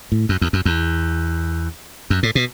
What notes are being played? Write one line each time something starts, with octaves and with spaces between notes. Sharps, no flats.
A2
F#2
E2
F#2
E2
F#2
A2
B2